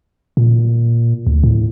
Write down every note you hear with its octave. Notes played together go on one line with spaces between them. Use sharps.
A#2
D2
A2